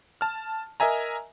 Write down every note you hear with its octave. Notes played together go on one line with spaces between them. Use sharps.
A5 F6
A#4 D#5 E5 G#5 A#5